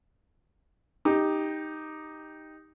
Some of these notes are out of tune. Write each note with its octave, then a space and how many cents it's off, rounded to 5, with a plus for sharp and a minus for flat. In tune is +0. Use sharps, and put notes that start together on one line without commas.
D#4 +0 G4 +10